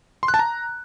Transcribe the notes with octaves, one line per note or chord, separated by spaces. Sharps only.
C6
F#6
A5
A#5